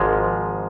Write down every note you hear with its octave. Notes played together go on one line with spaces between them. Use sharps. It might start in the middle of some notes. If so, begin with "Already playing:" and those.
Already playing: G#1 G#2 F3 G#3